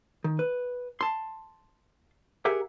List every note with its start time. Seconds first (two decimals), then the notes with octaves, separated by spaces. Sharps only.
0.24 D#3
0.39 B4
1.01 A5 C6
2.45 G4 G#4 A#4 E5 F#5